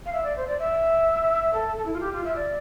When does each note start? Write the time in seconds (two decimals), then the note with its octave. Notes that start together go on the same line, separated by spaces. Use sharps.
0.06 F5
0.13 E5
0.24 D5
0.36 C5
0.47 D5
0.59 E5
1.53 A4
1.76 A4
1.85 E4
1.93 F4
2.00 G4
2.12 F4
2.24 E5
2.36 D5